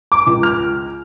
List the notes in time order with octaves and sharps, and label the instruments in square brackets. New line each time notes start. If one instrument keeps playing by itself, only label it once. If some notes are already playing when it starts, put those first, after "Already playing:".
[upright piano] D6
C#2
F6